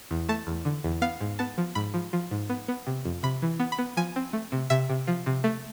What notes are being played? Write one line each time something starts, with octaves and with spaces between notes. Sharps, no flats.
E2
A3 A5
E2
D3
E2
B3 F5
G#2
B3 A5
F3
G#2 B5
F3
F3
G#2
B3
B3
C3
F2
C3 B5
E3
B3
B5
B3
F3 G#5
C4
A3
C3
C3 E5
C3
F3
C3
A3